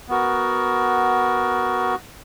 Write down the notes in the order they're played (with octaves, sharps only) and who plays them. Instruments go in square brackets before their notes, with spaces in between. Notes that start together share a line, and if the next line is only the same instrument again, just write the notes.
[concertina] B3 F#4 A#4